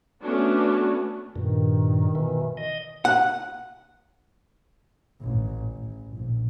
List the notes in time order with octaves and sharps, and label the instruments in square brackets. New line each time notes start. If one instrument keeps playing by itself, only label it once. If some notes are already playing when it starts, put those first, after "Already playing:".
[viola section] A3 B3 C#4 D4 F#4
[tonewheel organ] G2 A#2 [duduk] D#3
[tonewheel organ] B2 E3
D#5
[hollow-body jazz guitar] F#5
[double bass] A1
A1
A#1